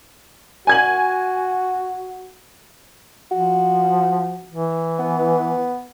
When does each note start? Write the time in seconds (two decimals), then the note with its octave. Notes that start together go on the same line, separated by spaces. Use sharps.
0.67 F#4 G#5 G#6 F#7
3.31 F3 F#4
4.48 E3
4.99 B3